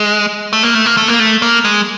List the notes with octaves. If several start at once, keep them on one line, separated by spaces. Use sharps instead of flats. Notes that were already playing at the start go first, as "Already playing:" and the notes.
Already playing: G#3
A3
A#3
A3
A#3
A3
A#3
A3
A#3
G#3